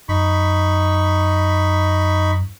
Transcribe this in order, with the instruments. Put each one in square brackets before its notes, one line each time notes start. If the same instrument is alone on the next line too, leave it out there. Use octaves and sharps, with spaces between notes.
[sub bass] F#2 [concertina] D#4 B5 C#6